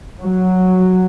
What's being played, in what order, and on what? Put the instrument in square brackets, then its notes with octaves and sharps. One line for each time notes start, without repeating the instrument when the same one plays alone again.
[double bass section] F#3